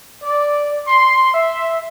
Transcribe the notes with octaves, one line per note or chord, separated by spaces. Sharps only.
D5
C6
E5